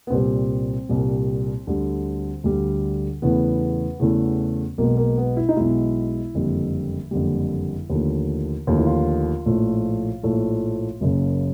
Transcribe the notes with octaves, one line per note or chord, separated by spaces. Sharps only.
B3
C2 A#2 G3 C4
C2 A#2 G3
D2 D3 G3
D2 D3 G3
E2 C#3 E3 A3 B3
E2 C#3 E3 A3
B1 B2 G#3 A#3
A#3
B3
E4
D#4
B1 B2 G#3 E4
F#1 F2 D3 G3
F#1 F2 D3 G3
D#2 D3 F3 A3
D#2 D3 F3 A3 F4
E4
F4
A#1 A2 F3 A3
A#1 A2 F3 A3
F#1 F#2 C#3